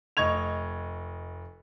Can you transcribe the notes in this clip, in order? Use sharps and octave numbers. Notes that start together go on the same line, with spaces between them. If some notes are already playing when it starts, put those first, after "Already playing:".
F1 D#5 C#6 G#6 F7